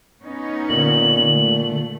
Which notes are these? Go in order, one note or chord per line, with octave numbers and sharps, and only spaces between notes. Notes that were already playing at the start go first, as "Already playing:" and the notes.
B3 C#4 D#4
A#2 D3 F#7
A3